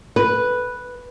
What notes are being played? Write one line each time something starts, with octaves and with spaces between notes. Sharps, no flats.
B4